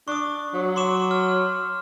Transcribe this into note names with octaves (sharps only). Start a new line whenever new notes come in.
D4 C#6 D#6
F#3
C6 D6 E7
F6